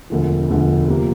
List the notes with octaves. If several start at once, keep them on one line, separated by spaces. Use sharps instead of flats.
E1 D2 D3 F3
E1 D2 D3 F3
C3 F3 A#3